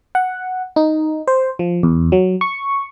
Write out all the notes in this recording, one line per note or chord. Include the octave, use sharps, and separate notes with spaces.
F#5
D#4
C5
F3
E2
F#3
C#6